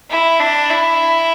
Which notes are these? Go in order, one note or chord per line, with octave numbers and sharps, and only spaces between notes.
E4
D4
E4